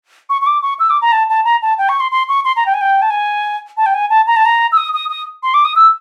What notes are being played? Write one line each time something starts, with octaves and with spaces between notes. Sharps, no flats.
C#6
C#6
D6
C#6
E6
D6
A#5
A5
A5
A#5
A5
G5
C#6
C6
C6
C#6
C6
A#5
G5
G#5
G5
A5
G#5
A5
G5
G#5
A5
A#5
A5
A#5
E6
D#6
D#6
D#6
C6
D6
D#6
E6